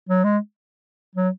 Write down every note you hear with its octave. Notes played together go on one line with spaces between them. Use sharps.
F#3
G#3
F#3